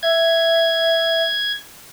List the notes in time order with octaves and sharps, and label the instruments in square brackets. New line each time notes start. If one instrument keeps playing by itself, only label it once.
[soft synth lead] E5 [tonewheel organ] G#6